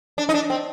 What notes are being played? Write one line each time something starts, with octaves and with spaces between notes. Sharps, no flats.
D4
D#4
D4
C4